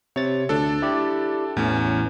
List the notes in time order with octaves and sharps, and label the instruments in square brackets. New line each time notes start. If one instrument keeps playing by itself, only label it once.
[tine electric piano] C3 A6 [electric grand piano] C#5
[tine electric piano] D2 [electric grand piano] D4 A4
[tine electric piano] E4 G4 D5
[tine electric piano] A1 A2 E3 [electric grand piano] E2 C#4